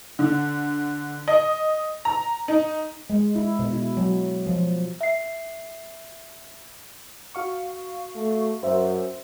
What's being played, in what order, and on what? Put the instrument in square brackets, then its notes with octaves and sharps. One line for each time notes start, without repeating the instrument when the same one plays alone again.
[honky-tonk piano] D3
D#5
A#5
D#4
[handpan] G#3
E4
B2
E4
F#3
F3
[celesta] E5 C7
[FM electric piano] F#4 F5 C#6
[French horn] A3
[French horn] F#2 [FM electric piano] C5 E5